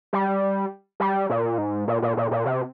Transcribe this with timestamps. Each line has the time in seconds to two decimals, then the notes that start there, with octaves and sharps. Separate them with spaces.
0.13 G3
1.00 G3
1.30 A#2
1.58 G#2
1.88 A#2
2.02 A#2
2.17 A#2
2.31 A#2
2.46 C3